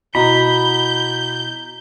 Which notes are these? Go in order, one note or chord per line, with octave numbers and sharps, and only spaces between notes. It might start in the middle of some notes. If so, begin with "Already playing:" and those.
B2 E4 D#5 A#5 B5 G6